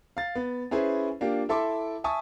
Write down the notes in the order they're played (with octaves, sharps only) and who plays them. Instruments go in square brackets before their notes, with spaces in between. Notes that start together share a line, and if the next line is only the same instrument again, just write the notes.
[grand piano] F5 A6
B3
C#4 E4 G#4 B4 C5
A#3 D4 F4 G4
E4 A4 E5 C6 D6
E5 G#5 A5 C#6 D#6